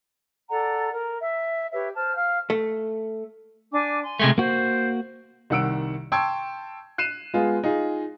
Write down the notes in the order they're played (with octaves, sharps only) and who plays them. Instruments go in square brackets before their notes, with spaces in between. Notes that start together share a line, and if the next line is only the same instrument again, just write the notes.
[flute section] A4 D5 F#5 A#5
A#4
E5
G4 B4 C#5 E5
C5 A5 F6
F5 F6
[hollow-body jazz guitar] A3
[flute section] D4 G#5 D6
G#5 C6
[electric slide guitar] C3 G#3 A3
[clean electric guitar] A#3 F#4 [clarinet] C5
[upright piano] C2 D#3 F#5 E6 D7
G5 A5 C6 C#6 E6 G#6
F#6 C7 D#7 E7
G#3 B3 F4 G#4
D#4 F4 G#4